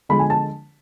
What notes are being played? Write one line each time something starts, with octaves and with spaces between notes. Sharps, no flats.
D3 F3 G#3 B5
G#5
A5